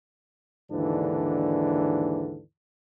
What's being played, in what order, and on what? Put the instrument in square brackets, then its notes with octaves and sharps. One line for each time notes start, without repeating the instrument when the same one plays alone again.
[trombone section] D#2 G#2 D3 E3 D4